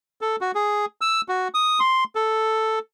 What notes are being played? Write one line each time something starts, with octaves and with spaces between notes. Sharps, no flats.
A4
F#4
G#4
E6
F#4
D#6
C6
A4